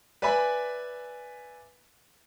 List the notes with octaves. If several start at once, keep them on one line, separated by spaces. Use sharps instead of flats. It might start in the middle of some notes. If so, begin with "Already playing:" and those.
B4 D5 E5 G#5 B5